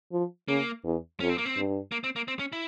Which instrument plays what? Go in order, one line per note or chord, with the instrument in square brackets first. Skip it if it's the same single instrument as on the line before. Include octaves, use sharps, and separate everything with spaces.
[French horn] F3
[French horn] C#3 [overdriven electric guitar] A#3
[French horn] E2
[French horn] F2 [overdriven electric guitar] C#4
[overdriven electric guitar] C4
A#3
C4
[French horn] G2
[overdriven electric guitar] A#3
C4
A#3
C4
C#4
E4